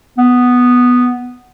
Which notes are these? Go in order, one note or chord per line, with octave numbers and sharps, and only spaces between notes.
B3